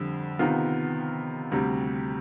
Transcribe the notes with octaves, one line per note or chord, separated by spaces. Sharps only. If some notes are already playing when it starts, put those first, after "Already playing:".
Already playing: F2 D3 G3 D4
C3 D#3 B3 F4
D2 C3 G3